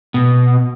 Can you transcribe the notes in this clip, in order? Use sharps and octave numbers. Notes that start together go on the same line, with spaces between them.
B2